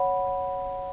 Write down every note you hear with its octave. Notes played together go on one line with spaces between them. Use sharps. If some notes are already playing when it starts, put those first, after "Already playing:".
Already playing: C#5 F#5 B5